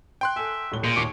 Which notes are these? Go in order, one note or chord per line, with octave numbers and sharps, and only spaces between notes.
G5 C6 F#6
A4 E5 G#5
D#1 A2 G7
A#2 G#3 G6
D#2 C#5 D6